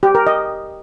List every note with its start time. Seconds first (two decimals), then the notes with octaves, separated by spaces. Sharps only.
0.03 G4
0.15 A#4
0.27 D#5